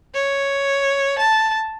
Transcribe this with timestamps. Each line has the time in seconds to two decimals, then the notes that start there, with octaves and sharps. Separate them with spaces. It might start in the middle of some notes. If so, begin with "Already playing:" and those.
0.14 C#5
1.18 A5